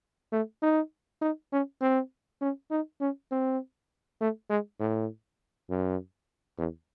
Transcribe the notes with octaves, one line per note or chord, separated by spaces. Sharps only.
A3
D#4
D#4
C#4
C4
C#4
D#4
C#4
C4
A3
G#3
A2
F#2
E2